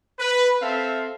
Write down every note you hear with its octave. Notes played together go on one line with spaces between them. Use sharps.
B4
C4 A4 E5 F5